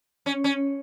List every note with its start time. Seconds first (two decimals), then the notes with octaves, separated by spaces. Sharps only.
0.26 C#4
0.44 C#4